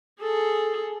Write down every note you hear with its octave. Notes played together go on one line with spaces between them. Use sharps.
G#4 A4